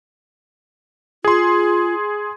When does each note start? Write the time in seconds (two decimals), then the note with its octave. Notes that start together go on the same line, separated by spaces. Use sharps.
1.24 F4 G#4 C6